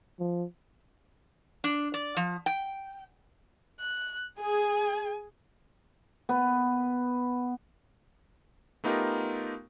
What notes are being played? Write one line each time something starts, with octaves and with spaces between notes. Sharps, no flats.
F3
D4
D5
F3
G5
F#6
G#4 G#5
B3
A3 B3 D#4 F4 G4 A#4